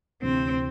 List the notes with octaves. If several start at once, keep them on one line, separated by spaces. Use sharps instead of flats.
D2 C3 E3 C4